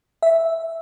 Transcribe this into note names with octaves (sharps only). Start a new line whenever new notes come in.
E5